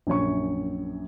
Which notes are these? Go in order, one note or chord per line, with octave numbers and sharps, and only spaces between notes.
A#1 F#2 C#5 C#6